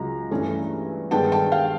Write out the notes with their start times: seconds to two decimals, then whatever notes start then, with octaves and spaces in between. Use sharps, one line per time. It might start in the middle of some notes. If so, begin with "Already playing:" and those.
Already playing: C#2 C#3 F#3 A#5
0.31 G2 E3 A3 C#4
1.11 G2 D#3 G#3 B3 D4 G5 A5
1.32 G5 A5
1.52 F5 G5